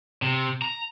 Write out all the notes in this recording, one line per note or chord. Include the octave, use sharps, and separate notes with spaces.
C3
A#5